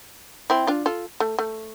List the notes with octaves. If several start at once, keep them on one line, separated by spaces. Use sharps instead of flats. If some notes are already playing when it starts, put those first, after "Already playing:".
C4 E4
D4 F4
F4 A4
A3
A3